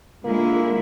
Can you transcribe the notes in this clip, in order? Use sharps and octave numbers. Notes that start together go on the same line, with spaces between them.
D3 G#3 A#3 E4 F4